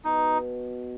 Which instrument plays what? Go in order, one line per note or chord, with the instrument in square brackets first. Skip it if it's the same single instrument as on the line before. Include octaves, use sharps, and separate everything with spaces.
[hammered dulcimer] B2 [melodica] D#4